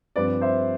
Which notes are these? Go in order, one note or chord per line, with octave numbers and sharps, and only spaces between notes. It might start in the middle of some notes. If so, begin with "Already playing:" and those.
G2 F3 C4 B4 D5
C5 E5